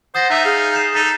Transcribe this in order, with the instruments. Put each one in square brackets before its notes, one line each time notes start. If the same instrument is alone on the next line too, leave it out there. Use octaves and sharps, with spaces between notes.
[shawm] C5 [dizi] F#5 [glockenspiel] D#6 A6 A#6
[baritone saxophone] D#4 [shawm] E5 [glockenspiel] F#6 G6
[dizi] G#4 [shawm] F5
[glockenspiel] G6 C7 E7
[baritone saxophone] D#4 [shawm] A4 [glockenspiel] A6 B6